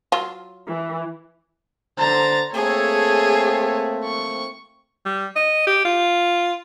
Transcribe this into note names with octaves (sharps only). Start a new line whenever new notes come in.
F#3 F4
E3
D3 C5 A#5 A6
A3 A#3 C4 G#4 A4 C#5
C#6
G3
D#5
G4
F4